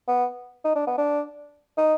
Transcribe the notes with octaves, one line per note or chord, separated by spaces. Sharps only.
B3
D#4
D4
B3
D4
D#4